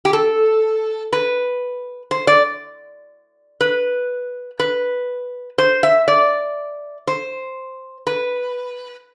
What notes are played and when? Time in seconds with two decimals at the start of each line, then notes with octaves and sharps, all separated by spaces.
0.05 G4
0.13 A4
1.13 B4
2.11 C5
2.27 D5
3.61 B4
4.60 B4
5.58 C5
5.83 E5
6.08 D5
7.07 C5
8.07 B4